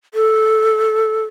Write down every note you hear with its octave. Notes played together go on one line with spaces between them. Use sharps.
A4